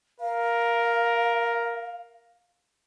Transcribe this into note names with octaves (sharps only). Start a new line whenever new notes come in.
A#4 F5